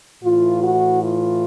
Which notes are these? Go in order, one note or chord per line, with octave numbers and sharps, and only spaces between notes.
A2 E3 F4
F#4
F4